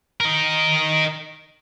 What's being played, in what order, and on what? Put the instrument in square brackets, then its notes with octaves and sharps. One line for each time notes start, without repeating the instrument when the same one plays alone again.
[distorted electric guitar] A#4 D#5